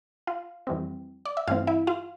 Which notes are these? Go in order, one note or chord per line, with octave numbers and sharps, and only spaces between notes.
F4 F5
F2 E3 G3 C4
D5
E5
G2 E3 A3 C4 F4 F5
E4 E5
F4 F5